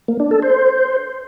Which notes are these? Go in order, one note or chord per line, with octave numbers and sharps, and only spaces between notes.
A#3
D4
A4
C5